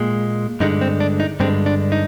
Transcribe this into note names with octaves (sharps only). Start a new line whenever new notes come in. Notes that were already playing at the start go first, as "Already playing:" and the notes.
Already playing: A#2 G#3
G2 D3 G#3 D#4
C4
D4
D#4
G2 D3 G#3 C4
D4
D#4